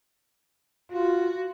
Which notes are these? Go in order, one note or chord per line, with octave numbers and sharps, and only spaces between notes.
F4 F#4